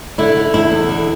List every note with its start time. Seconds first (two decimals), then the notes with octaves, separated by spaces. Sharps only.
0.18 D3 E4
0.36 D3
0.53 E2 E4
0.71 E2
0.89 D3